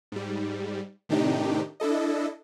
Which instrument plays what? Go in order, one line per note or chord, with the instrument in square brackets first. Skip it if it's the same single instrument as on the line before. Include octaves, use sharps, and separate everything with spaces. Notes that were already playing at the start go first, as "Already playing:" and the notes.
[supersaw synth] G#2 G3
A2 C3 D#3 D4 D#4 G4
D4 E4 A4 D#5